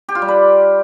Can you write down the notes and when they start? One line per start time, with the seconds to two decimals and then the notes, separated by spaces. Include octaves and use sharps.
0.09 G4
0.15 F4
0.22 G3
0.28 B4